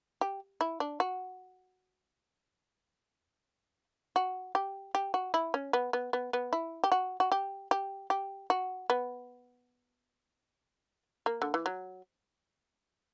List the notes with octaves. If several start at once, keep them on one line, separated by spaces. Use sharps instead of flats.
G4
E4
D4
F#4
F#4
G4
G4
F#4
E4
C#4
B3
B3
B3
B3
E4
G4
F#4
F#4
G4
G4
G4
F#4
B3
A#3
D3
E3
F#3